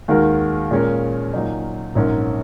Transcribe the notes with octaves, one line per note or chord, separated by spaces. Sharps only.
D#2 D#3 G#3 F#4 A#4
A#2 G#3 C#4 A#4
A#2 F#3 D#4
A#1 G#2 F#3 C#4 A#4